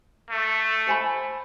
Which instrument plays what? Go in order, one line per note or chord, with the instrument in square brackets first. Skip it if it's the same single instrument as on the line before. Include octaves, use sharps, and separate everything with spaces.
[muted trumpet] A3
[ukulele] C5 G#5 B5